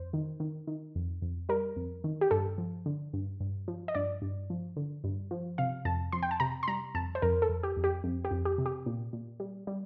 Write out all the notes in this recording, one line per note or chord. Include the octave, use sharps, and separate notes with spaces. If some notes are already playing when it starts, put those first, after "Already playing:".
Already playing: F2 C5
D#3
D#3
D#3
F2
F2
G3 A#4
F2
D#3
G4
G2 A4
F3
D3
G2
G2
F3
D#5
G2 D5
G2
F3
D3
G2
F3
C3 F5
F2 A5
F2 C6
G5
A5
C3 A#5
C6
G3 A#5
F2 A5
C5
F2 A#4
A4
F2
G4
F2
G4
F2
G4
F2
G4
C3
G4
A#2
A#2
G3
G3